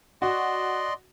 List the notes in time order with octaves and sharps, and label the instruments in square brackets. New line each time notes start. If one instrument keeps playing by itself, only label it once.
[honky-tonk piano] F#4 [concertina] D5 D#5 C6